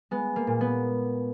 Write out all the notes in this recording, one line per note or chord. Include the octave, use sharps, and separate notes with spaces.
G#3 B3
A#3
A#2
B3